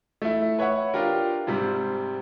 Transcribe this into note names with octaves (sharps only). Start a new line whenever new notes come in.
A3 E4
B4 C#5 E5 F#5
D4 F4 G4 A#4
G#2 C3 G3